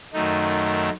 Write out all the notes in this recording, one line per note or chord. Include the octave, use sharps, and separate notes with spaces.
F#2 D#3 A3 D#4